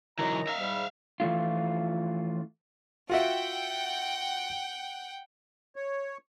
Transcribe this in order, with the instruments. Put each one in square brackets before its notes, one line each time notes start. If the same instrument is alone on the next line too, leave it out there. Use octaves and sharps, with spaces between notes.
[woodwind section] F#2 D#4 A#5 [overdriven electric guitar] E3 F#3
[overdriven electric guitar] E5 F5
[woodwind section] G#2 G3
[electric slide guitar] E3 F3 A3 F4
[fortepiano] F4 F#4 E5 [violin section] F#5 G5
[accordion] C#5